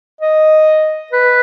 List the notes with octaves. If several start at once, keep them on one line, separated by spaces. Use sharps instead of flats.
D#5
B4